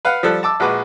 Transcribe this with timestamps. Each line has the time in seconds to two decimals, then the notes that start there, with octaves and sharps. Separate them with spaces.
0.05 B4 F5 F#5
0.23 F3 G3 A4 F#6
0.43 A5 D6 E6
0.60 A#1 G#3 F#4 B4 D6